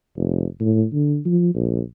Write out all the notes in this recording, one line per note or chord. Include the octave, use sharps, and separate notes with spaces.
F1
A2
D3
F3
A#1